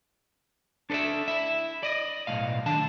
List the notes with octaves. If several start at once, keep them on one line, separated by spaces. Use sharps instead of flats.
D4 A4 B4 D5 E5
E4 E5
D5 D#5
B1 A2 F5
D#3 D4 A5